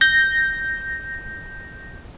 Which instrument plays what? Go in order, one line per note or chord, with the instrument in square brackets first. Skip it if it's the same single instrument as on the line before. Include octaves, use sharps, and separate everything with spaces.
[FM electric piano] G6 A#6